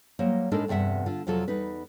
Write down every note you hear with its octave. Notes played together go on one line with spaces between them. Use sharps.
F#3 G3 A#3 C5
A2 G#3 D4 D#4 A4 A#4
E2 G2 C3 E5 F#5
D3 F4
F2 C3 F#3 F4 A4
E2 G3 D#4 B4